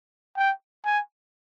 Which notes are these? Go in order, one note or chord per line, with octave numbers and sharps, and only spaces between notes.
G5
G#5